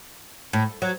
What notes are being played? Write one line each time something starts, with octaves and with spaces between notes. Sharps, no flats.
A2
F#3